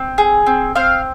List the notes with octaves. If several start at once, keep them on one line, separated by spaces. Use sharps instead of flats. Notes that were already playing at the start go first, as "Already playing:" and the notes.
Already playing: C4
G#4
C4
C4 F5